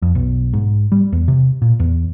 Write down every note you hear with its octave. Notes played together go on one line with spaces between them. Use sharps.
F2
B1
G#2
G3
E2
C3
A#2
E2